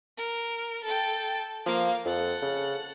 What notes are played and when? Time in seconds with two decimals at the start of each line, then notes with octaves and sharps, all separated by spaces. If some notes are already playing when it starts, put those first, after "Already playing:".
0.18 A#4
0.84 A4 G5
1.66 F3 A#3 F5
2.05 F2 A4 F#5
2.42 C#3